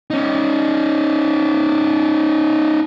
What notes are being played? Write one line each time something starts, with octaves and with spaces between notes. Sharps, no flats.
C#4 D#4